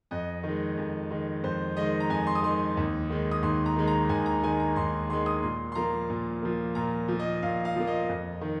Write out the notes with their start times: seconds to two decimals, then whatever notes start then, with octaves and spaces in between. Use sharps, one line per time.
0.11 F2 D#5
0.43 D#3
0.49 G#3
0.77 F2
1.10 D#3 G#3
1.43 F2 C5
1.77 D#3 G#3 D#5
2.00 A#5
2.10 F2 G#5
2.27 C6
2.35 D#6
2.43 D#3 G#3 C6
2.77 D#2
3.10 D#3 G#3
3.31 D#6
3.43 D#2 C6
3.66 A#5
3.76 D#3 G#3
3.88 A#5
4.09 D#2 G#5
4.26 A#5
4.43 D#3 G#3 G#5
4.60 A#5
4.76 D#2 C6
5.09 D#3 C6
5.13 G#3
5.26 D#6
5.43 A#2 C6
5.72 C6
5.75 F3 A#3 A#5
6.10 A#2
6.42 F3 A#3
6.75 A#2 A#5
7.08 F3 A#3
7.19 D#5
7.43 A#2 F5
7.65 F5
7.76 F3 A#3
7.87 D#5
8.09 F2
8.41 D#3